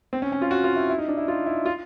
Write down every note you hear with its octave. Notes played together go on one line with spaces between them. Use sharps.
C4
C#4
C#4
F4
F#4
F4
E4
E4
D#4
D4
E4
F4
E4
F4